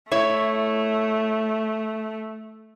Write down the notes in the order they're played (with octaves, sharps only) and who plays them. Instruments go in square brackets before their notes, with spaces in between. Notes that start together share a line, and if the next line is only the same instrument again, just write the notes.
[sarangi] A3 [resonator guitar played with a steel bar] E4 C#5